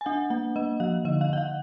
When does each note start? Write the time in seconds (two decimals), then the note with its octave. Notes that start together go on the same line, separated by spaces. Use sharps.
0.01 G#5
0.06 D4 F#5
0.30 A#3 F#5
0.56 A#3 D#5
0.80 F3 F5
1.05 D3 D#5
1.21 F5
1.30 D3 F#5
1.38 F5